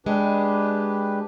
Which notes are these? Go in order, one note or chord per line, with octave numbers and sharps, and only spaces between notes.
G#3 D4 G4 B4